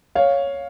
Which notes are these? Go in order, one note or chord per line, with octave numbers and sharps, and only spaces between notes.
C#5 F5